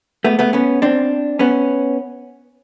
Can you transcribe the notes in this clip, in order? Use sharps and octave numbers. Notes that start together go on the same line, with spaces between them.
A3 B3
A3 B3
B3 C#4
C4 D4
B3 C#4